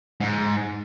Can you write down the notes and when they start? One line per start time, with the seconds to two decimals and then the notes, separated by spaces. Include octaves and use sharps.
0.20 G#2